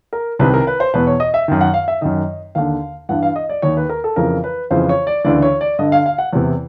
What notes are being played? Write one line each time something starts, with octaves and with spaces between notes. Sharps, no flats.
A#4
C2 C3 D#3 B4
A#4
B4
C5
E2 B2 B4
C#5
D#5
E5
F#2 D#3
F#5
F5
E5
F#2 D#3 D#5
D#2 D3 F5
G2 E3 F#5
F5
D#5
D5
D#2 D#3 C#5
B4
A#4
A4
F2 C#3 E3 A#4
B4
F2 C#3 E3 C5
C#5
D5
D2 C#3 E3 D5
C#5
D5
G2 D3 D#5
F5
F5
F#5
E2 C3 E3